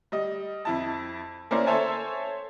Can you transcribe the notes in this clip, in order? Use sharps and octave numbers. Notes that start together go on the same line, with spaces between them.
G3 D#5
F2 E4 A5
A#3 C#4 E4 A#4 C5 D5
A4 C5 C#5 E5 G#5 A5